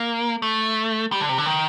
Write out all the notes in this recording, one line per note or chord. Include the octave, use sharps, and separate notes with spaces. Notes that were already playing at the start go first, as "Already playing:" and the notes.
Already playing: A#3
A3
G3
D3
C3
D3
D#3